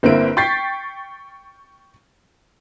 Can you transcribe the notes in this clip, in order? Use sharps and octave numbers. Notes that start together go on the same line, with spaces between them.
G1 A#3 C4 E4 D7
G5 C#6 G6 A6 B6 C7